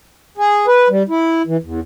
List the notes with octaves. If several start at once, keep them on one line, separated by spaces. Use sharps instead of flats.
G#4
B4
G3
E4
E3
E2